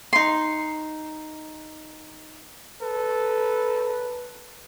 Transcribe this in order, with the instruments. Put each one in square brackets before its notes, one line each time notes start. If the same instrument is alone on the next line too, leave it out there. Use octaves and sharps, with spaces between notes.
[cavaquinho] D#4 C6
[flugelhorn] A4 [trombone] B4